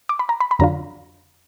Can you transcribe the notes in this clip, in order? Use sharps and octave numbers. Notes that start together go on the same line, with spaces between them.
D6
B5
A#5
B5
B5
F2 D3 F#3 D4 F4 A#5